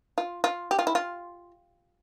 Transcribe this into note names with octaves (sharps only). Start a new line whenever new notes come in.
F4
F4
G4
F4
E4
F4